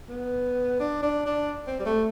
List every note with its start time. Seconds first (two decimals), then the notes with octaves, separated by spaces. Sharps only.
0.09 B3
0.80 D4
1.03 D4
1.26 D4
1.67 C4
1.80 G3
1.86 A3